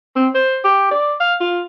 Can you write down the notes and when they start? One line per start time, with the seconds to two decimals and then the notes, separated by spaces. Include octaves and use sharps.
0.16 C4
0.35 C5
0.64 G4
0.91 D5
1.20 F5
1.41 F4